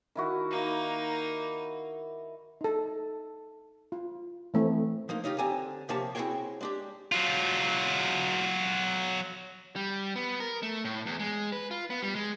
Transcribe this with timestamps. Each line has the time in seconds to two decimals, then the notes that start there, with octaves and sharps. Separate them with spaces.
0.15 D#3 E4 F#4
0.50 A#3 D#4
2.61 D#4 A4
3.92 F4
4.54 E3 A3 C4
5.09 F3 A#3 D#4
5.24 C#3 D#4 F4 G4
5.38 D3 C4 G4 C#5 G#5 A#5
5.89 C3 F3 A#3 G4 C#5 A5
6.15 C4 E4 F#4 G#4 C#5 G5
6.61 G#3 D4 G4
7.12 F#3 F4
9.76 G3
10.16 B3
10.40 A#4
10.63 A3
10.85 A2
11.06 E2
11.20 G#3
11.52 B4
11.71 F4
11.90 B3
12.02 G3
12.15 G#3